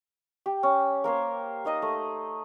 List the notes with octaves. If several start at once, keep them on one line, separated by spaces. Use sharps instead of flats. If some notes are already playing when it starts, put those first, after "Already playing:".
G4
C#4
A#3 A#4 C5 C#5
A#3 D#4 D#5 A#5
A3